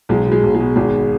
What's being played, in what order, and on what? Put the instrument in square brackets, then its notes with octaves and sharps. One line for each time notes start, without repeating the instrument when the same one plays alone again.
[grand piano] B1 G#3
B2
G#3
B1
G#3
B2
G#1 G#3